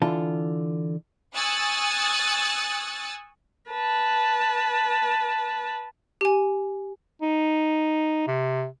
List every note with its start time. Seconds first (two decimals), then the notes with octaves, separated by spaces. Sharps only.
0.02 D3 E3 F4 A5
1.35 G#5 C#6 D#6 E6 F#6 A6
3.71 B4 A5
6.21 G4 G#5
7.22 D#4
8.27 C3